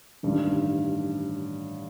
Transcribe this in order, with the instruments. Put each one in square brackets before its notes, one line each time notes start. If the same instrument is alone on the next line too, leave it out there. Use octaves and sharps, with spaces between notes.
[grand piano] A1 G2 D#3